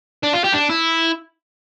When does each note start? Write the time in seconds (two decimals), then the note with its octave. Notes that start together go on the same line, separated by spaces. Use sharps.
0.23 D4
0.33 F4
0.44 G4
0.54 D4
0.70 E4